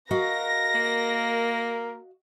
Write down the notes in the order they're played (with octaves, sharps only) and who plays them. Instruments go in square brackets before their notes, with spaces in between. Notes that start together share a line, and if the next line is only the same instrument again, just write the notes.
[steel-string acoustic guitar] F#4 D#5 F5 [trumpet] A#4 [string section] A#6
[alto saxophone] A#3